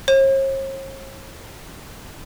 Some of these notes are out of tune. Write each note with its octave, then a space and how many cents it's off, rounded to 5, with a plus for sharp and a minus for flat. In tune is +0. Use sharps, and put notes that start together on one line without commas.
C#5 -45